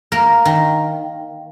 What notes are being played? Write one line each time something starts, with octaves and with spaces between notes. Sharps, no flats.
A#3 A#4
D#3